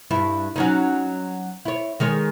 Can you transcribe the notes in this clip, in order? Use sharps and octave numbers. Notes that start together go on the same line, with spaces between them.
G2 E4
F#3 C#4 D#4
E4 C#5
D#3 G#3 C#5